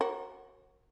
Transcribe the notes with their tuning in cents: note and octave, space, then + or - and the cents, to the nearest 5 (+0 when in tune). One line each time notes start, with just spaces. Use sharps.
F#4 +10 A#4 +0 C#5 -40